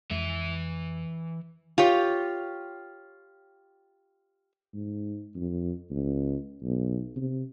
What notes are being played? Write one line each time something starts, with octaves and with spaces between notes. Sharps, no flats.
F2 E3 G#3 E5
F4 G4 C#5
G#2
F2
C#2
B1
C3